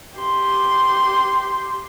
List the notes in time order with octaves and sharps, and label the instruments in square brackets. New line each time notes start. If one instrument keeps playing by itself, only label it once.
[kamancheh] G4 C6